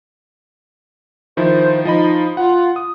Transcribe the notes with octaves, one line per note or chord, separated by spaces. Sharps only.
D#3 F3 E4 C5
F3 D#4 D#5 B5
F4 F#5
D#6